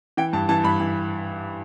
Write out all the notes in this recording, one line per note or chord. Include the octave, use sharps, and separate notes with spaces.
E3 G5
G2 A5
E3 A5
G2 B5
E3